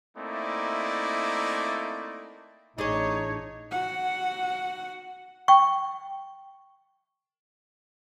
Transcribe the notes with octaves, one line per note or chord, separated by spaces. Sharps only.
A3 A#3 C4 D#4 E4 D5
A1 D4 D#4 G#4 C#5 D#5
F#4 F#5
G5 C#6